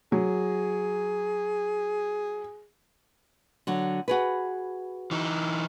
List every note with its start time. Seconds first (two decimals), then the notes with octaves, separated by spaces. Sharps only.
0.12 F#3 G#4
3.67 D3 F#3
4.08 F#4 G#4 B4
5.11 E3 D#4